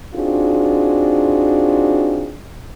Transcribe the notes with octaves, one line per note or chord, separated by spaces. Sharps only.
C4 D4 D#4 F4 F#4 G#4